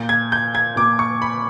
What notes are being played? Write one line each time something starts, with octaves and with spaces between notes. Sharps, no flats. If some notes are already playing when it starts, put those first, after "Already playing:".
Already playing: A#2 G6
G#6
G6
G#6
A#2 D6
C#6
B5